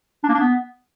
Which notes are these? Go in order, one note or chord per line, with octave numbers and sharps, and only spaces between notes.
D4
A#3
D4
B3